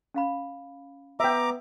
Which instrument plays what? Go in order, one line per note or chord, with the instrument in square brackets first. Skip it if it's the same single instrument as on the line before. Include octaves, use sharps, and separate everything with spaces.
[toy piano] C#4 F5 B5
[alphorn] B3 [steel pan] E5 G5 [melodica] A#5 D6